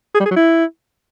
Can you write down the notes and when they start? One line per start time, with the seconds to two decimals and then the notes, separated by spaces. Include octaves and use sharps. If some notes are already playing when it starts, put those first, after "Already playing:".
0.15 G#4
0.20 G3
0.25 G#4
0.31 F#3
0.36 E4